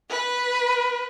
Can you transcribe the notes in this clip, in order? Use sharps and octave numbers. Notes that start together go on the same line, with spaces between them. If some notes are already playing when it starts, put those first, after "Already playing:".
B4